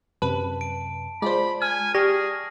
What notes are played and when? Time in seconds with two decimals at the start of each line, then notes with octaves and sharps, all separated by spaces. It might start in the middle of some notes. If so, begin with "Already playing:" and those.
0.22 F#2 C3 B4 A5
0.61 D7
1.22 G#3 F4 C5 D5 B5
1.62 G#5 F6
1.94 G4 G#4 D5 C#6 F6 A#6